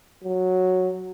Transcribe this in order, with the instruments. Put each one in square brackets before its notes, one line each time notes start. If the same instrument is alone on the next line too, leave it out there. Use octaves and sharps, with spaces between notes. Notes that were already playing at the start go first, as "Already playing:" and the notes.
[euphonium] F#3